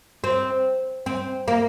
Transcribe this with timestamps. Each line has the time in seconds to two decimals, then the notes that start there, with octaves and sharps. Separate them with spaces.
0.24 C4
1.06 C4
1.48 A#3